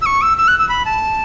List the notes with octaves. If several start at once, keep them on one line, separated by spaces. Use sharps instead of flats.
E6
C#6
E6
E6
F#6
E6
B5
A5